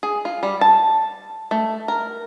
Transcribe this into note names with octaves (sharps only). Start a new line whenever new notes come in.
G#4
F4
G3
A5
A3
A#4